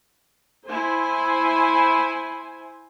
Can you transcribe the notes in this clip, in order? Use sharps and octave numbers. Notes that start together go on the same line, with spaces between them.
E4 C5 G#5